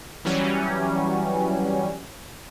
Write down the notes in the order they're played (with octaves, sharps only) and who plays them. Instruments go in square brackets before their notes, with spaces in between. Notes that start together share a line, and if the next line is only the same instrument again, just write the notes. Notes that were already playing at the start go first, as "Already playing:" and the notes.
[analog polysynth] E3 F#3 G3 C#4